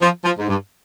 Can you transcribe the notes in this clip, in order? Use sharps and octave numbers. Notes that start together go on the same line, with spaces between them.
F3
F3
G#2
G2